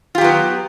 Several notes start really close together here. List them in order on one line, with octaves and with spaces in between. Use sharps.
F4 G4 F#3 B3